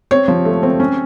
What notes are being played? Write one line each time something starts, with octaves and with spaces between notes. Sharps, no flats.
C4 C#5
F3
A3
C4
C#4